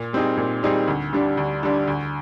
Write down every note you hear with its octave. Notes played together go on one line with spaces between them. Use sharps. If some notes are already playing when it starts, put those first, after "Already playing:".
Already playing: A#2
G3 C4 D#4 G#4
A#2
G3 C4 D#4 G#4
D2
D3 G3 D4
D2
D3 G3 D4
D2